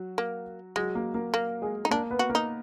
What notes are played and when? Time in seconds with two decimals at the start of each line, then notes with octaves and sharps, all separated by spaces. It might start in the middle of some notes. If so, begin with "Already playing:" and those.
Already playing: F#3 F#4
0.18 A#3
0.76 F#3 G#3 F#4
0.95 A#3 A#4
1.14 A#3 A#4
1.34 A#3
1.62 G#3 G#4
1.85 D#4
1.91 A#3 D4 A#4
2.11 B3 B4
2.19 F#4
2.29 A#3 A#4
2.35 D#4